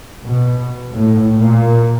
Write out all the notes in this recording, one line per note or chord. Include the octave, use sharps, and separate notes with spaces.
B2
A2
A#2